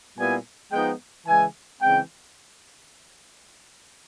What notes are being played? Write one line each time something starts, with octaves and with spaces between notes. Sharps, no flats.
A#2 G3 B3 E4 G#5
F3 G#3 B3 D#4 G5
C#3 E3 G#3 G#5
C#3 E3 G#3 C4 G5